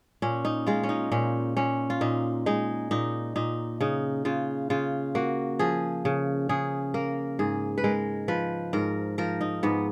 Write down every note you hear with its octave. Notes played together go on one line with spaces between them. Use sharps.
A#2 C#4
D#4
G#3 F4
C#4
D#4
A#2 C#4
A#2 C#4
F4
A#2 D#4
G#3 D#4
A#2 D#4
A#2 D#4
C#3 D#4
C#3 F4
C#3 F4
A#3 F#4
F3 G#4
C#3
C#3 G#4
A#3 A#4
G#2 G#4
B4
G#3 A#4
F3 B4
G#2 A#4
F3 A#4
D#4
G#2 B3